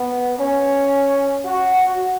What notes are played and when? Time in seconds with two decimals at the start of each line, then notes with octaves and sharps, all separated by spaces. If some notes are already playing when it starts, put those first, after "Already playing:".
Already playing: B3
0.38 C#4
1.45 F#4